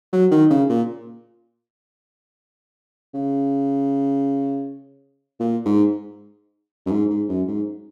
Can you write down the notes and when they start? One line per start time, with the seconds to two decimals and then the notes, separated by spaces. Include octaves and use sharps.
0.13 F#3
0.31 D#3
0.50 C#3
0.69 A#2
3.14 C#3
5.40 A#2
5.65 G#2
6.86 F#2
6.91 G#2
7.10 G#2
7.29 F#2
7.48 G#2